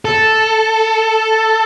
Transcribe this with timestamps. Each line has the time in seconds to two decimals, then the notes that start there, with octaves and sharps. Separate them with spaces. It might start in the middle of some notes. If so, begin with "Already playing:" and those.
0.05 A4